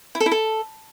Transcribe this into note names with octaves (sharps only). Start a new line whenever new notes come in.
E4
A4
E4
A4